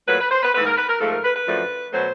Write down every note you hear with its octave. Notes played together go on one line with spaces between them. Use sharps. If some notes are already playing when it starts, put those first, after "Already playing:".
A#2 F#3 A3 B4
B4
C5
B4
G#2 E3 A3 B4
A#4
B4
A#4
G#2 F3 A3 A4
A#4
B4
B4
F#2 D3 F3 A3
B2 F#3 A3 C5